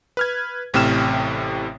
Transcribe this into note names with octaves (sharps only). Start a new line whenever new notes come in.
B4 F6 G#6
A1 A2 C3 G5 F6 E7